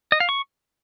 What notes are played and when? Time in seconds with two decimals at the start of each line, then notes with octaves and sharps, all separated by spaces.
0.12 D#5
0.20 F5
0.29 C#6